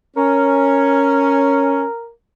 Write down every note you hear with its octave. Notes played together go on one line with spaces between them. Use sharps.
C#4 A#4